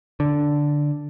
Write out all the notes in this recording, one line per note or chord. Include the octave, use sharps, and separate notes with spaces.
D3